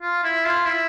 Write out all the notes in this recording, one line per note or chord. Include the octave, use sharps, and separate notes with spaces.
F4
E4
F4
E4